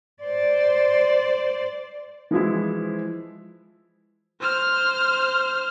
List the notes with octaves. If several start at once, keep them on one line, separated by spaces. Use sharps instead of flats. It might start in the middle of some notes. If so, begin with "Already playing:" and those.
C5 D5
E3 F3 G#3 E4
C5 F6